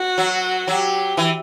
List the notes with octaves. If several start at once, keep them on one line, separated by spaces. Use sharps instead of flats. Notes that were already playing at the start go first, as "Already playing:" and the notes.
Already playing: F#4
F#3
F#3 G4
E3